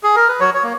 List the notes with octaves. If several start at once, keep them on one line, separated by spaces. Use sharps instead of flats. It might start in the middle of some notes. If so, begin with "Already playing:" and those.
G#4
A#4
B4
F#3 C#5
C#5
A#3